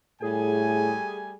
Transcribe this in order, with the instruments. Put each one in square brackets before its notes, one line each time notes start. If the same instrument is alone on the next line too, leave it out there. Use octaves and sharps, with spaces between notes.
[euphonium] A2 [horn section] G3 A3 G#5 [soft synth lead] G#4